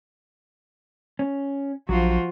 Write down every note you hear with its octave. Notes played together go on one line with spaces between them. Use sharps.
C#4
A#1 F3 F#3 F4 F#4